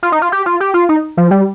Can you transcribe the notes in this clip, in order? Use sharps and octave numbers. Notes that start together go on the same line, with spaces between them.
F4
D#4
F4
G4
F4
G4
F4
D#4
F3
G3